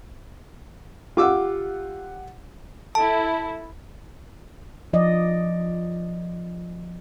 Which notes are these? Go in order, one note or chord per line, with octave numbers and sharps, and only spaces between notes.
F4 G4 F#5 D6 E6
E4 A4 A5
F3 D5 D#5